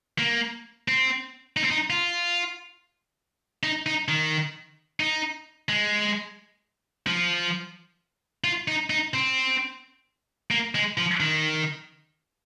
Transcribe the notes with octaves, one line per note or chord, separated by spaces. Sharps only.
A#3
C4
D#4
C4
D#4
F4
D#4
D#4
D#3
D#4
G#3
F3
F4
D#4
D#4
C4
A#3
G#3
F3
D#3